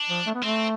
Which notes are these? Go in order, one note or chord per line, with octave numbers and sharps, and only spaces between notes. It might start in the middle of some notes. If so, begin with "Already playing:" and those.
Already playing: D4
F3
A3
B3
A3 C4